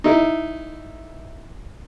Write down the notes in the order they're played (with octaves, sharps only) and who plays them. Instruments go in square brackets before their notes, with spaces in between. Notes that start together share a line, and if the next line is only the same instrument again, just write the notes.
[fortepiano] D#4 E4